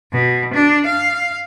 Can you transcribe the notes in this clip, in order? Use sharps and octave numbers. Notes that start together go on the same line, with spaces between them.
B2
D4
F5